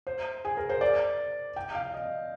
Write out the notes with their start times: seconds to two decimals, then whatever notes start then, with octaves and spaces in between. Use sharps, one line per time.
0.07 C5
0.45 G#4
0.57 A#4
0.69 C5
0.81 D5
1.56 G5
1.75 F5
1.94 D#5